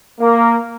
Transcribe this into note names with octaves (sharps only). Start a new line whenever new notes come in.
A#3